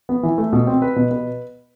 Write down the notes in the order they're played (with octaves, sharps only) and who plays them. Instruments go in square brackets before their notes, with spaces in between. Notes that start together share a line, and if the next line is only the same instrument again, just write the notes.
[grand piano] B3
E3
A3
B2
C4
B4
B2
B4